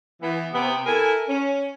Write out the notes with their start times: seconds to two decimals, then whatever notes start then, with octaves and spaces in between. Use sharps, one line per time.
0.22 E3 B3
0.53 C3 B3
0.86 E4 A4 A#4 G#5
1.28 C#4